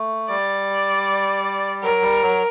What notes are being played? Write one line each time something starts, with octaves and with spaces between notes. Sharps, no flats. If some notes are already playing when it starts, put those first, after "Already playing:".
Already playing: A3
G3 D5
F#3 A#4
G3
F#3